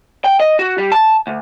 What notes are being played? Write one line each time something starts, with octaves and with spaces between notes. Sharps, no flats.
G5
D#5
F#4
G3
A5
D2